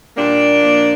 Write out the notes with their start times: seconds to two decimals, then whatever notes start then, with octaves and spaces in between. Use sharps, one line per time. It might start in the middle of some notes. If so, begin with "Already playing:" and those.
0.17 A#2 G3 A#3 D4
0.62 A#2 F3